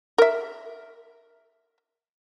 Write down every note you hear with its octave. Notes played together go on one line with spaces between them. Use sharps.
A#4 E5